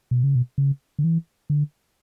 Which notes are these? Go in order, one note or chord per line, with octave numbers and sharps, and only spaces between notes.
B2
C#3
B2
C#3
D3
E3
D3